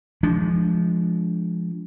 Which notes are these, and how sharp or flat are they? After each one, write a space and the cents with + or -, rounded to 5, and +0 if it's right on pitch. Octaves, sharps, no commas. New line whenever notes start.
F3 -15 G#3 +5 D4 -25